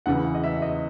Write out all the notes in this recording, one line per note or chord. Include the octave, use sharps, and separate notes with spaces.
E2 C#3 E3 F#5
D#5
E5
D#5